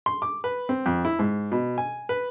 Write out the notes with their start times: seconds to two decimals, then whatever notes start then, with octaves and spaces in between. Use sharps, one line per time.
0.06 C6
0.22 D6
0.44 B4
0.69 C4
0.86 F2
1.05 E4
1.19 G#2
1.52 B2
1.78 G#5
2.09 B4